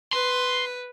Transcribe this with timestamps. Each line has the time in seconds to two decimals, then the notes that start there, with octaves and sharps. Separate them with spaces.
0.13 B4 C6